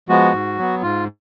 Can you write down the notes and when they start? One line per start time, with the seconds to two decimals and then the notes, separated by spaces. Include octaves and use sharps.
0.09 F3 G#3 B3 F#4
0.33 G#2
0.58 F#3 B3
0.82 G#2 F4